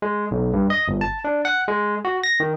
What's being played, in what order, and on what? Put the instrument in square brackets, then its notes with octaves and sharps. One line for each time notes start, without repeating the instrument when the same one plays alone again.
[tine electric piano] G#3
B1
G2
D#5
G1
A5
D4
F#5
G#3
F#4
A#6
D#3